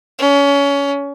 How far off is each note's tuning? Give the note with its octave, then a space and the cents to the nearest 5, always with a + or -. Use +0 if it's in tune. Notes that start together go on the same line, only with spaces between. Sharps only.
C#4 +25